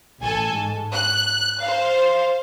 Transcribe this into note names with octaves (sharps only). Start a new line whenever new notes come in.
A1 A4 G#5
G#2
F#6
C5 F5